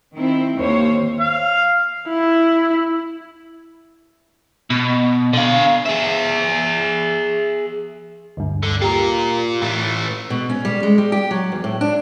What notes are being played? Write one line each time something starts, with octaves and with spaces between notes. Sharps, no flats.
D#3 C4 E4
D#2 A#3 C5 C#5
F5
E4
B2
D3 F5
G#4 E5
D2 G2
D3
F4 G4 A#4
A2 E3 A3
B2
C#4
G3
G#3
G3
G4
F#3
E2
A2
D4